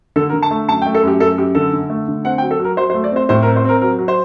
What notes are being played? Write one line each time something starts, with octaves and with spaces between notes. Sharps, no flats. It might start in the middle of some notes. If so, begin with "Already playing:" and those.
D3 A4
A#4
D3
A5
A3
F#2 A5
G5
A3
A4
F#2 G4
F#2 A4
F#2 G4
D3 A4
D3
A3
D3
C4 F#5
G5
F#3
A4
F#3 A#4
F#3 C5
C5
A3
D5
C4 C5
A2 C5
A#4
C4
C5
C4 A#4
F#3 A#4
F#3
C5